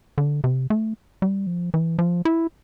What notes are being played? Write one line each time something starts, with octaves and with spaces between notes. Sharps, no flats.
D3
C3
A3
G3
F3
E3
F3
E4